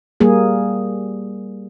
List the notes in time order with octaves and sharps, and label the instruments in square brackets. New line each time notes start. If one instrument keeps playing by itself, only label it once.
[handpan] G3 A#3 G#4